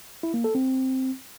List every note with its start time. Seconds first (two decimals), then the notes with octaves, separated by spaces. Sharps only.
0.23 E4
0.34 A#3
0.44 A4
0.55 C4